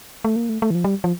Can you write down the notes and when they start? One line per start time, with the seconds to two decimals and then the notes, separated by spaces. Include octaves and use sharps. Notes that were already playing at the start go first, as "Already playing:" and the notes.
0.24 A3
0.36 A#3
0.49 A3
0.62 A3
0.71 E3
0.75 F3
0.84 G3
1.04 F3